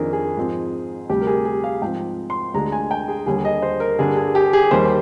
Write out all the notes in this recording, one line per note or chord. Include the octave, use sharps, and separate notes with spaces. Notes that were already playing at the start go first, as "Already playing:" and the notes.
Already playing: F2 D#3 A#3 D4 G#4 A#4
G#4
G#2 F3 G#3 C4
D2 C3 G3 G4
A#4
G#4
G#4
F5
G#2 F3 C4 G5
C6
D2 D3 G#3 D4 A#5
G#5
G5
G#4
D#2 D3 G3 G#4
D#5
C5
A#4
G2 D3 G3 A#3 D4 G#4
G#4
G4
G#4
D#2 D#3 G3 C5